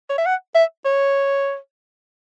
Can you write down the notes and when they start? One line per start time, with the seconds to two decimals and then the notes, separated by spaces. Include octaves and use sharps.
0.10 C#5
0.18 E5
0.26 F#5
0.55 E5
0.85 C#5